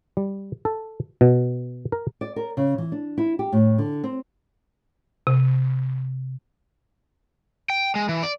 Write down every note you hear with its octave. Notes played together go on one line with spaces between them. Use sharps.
G3
A4
B2
A#4
D5
A#4
C#3
E3
D4
E4
G4
A2
D3
C4
C3
G5
G#3
E3
D5